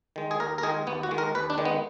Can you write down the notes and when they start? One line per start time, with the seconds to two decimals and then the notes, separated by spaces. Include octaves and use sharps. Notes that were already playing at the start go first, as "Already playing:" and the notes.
0.16 D#3 G#3
0.31 G#4
0.40 D#2 A#4
0.58 A#4
0.63 D#3 G#3 G#4
0.87 D#2 B3
1.03 F#4
1.11 D#3 G#3
1.18 A#4
1.35 D#2 B4
1.50 D4
1.58 D#3 G#3
1.65 B3